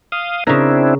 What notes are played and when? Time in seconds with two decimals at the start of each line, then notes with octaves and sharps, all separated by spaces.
0.12 F5 D#6
0.47 C#3 C4 D4 E4 A#4